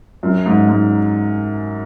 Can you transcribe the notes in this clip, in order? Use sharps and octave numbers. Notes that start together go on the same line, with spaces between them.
F#2
G#2
G#2